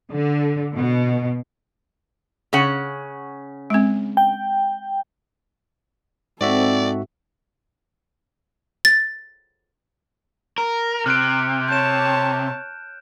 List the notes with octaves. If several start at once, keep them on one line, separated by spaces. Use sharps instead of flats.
D3
B2
C#3 C#4 F#5
G#3 C4
G5
G#2 C4 F#4 A4 D5 E5
A6
A#4
C3 F6 F#6 D7
C#5 A5 G6 E7